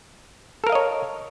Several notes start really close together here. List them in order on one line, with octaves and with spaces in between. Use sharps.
A4 A#4 F5 D#5 C#5